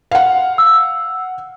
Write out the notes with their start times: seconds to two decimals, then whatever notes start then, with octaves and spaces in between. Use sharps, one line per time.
0.11 F5 F#5
0.58 E6